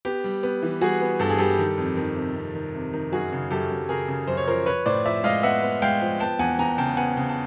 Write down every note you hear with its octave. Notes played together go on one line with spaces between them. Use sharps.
B3 G4
G3
B3
E3
G3 F#4 G#4
B3
G2 A4
G#4
G3 G4 A4
D#3
F2
D#3
C3
C3
D#3
C3
D#3
F#2 F#4 G#4
C#3
F#2 G4 A4
F#2
C#3 G#4 A#4
C#3
F#2 C5
C#5
F3 A#4 C5
F3 B4 C#5
A2 C5 D5
F3 D5 E5
G#3 D#5 F5
B3 E5 F#5
B3
G#3 F5 G5
F3
B3 G5 A5
E2 F#5 G#5
E2 G#5 A#5
C#3 G5 A5
B3 F#5 G#5
C#3
A5